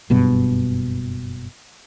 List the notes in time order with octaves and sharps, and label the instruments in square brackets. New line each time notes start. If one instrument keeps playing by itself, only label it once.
[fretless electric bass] F#1 G2 B2